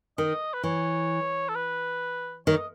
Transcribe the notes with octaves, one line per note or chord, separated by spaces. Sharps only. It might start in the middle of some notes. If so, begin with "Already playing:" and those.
D#3 D#5
B4
E3 C#5
A4
B4
D#3 C#5
D#5